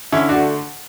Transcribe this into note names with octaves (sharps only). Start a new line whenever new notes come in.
D3 C#4 E4
D4 F#4
A3